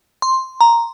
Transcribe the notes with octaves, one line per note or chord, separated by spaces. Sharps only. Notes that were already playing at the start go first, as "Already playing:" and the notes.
C6
A#5